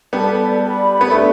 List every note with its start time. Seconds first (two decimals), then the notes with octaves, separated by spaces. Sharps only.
0.13 G3 B3 A4 D5 A5
0.62 G4 D5 B5
1.01 B3
1.11 A3 D4 G4 E5